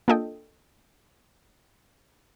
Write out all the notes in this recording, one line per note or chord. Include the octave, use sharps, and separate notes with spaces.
A#3 D4 F4 A4 D#5 G5